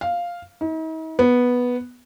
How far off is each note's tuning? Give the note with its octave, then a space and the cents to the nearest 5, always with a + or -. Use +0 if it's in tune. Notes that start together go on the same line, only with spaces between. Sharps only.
F5 +0
D#4 +45
B3 -5